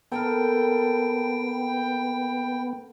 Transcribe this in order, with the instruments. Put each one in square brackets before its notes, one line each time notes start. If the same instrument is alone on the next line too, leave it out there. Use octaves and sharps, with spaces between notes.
[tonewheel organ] B3 [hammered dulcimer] A4 A#4 [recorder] G5